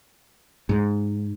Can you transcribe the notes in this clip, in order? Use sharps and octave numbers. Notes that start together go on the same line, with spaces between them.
G#2